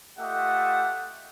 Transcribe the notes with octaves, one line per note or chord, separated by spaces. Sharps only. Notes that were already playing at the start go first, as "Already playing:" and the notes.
A3 F4 G4 D#5 E5 F#5